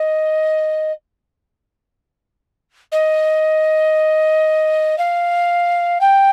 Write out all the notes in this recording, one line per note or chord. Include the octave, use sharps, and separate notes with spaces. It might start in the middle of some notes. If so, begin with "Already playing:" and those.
Already playing: D#5
D#5
F5
G5